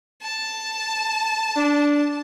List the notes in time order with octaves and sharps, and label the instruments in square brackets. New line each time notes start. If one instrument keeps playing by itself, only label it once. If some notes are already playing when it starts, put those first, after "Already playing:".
[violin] A5
[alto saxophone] D4